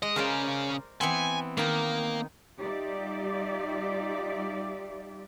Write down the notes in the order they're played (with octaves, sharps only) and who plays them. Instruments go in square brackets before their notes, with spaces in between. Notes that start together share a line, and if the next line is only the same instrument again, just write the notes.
[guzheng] G#3 [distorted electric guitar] D#5
[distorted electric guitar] C#3 C#4 [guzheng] A#4 C5 D5
[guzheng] E3 B3 C4 [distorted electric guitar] G#5
[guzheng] D#3 D#4 [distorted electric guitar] A#3
[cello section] G3 D#4 F4 G4 D5 E5